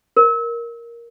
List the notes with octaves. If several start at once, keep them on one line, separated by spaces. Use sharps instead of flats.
A#4